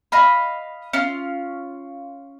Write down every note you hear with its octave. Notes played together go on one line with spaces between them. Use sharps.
D#5 F5 B5
C#4 F4